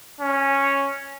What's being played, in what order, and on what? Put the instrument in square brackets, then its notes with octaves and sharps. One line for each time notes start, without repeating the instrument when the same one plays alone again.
[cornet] C#4